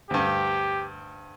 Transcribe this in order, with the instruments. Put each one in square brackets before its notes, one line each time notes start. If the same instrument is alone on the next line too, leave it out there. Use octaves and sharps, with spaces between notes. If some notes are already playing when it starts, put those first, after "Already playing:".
[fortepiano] D2 G2 [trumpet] G4